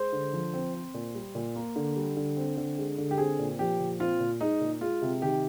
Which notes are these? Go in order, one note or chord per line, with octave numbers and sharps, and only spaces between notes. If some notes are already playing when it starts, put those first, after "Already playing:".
Already playing: G#3 C5
D3
F3
C4
C4
A#2
G3
A#2
A#3
D3
G3
D3
C4
D3
G#3
D3
G4
C4 G#4
A#2
F3 G4
A#2
C4 F4
A#2
G#3 D#4
A#2
G#3 F4
C3
D#3 G4